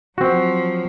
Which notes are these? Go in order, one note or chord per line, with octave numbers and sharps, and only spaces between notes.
F3 F#3 C4 F#4